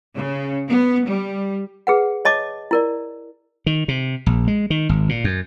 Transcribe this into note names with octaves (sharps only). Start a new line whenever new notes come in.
C#3
B3
G3
G#4 B4 F#5
C#5 D#5 A5 D6
E4 A#4 D5
D#3
C3
A#1
G#3
D#3
G#1
A#2
F#2